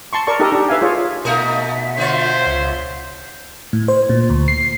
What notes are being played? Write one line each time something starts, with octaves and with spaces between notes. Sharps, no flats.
A5 C6 C#6
A#4 D5 A5 C#6
D#4 G4 A4 A#4 D#5
D4 G4
B4 E5 F5 G#5
F4 G#4 C#5
B2 A3 D#4 A#4 E5 F#5
D3 F4 C5 C#5
C#2
A2
C5
A#2
D2
C7